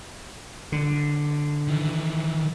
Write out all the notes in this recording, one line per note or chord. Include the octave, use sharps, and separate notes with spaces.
D3
D#3 E3